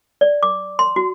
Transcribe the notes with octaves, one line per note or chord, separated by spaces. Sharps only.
D5
D6
C6
F#4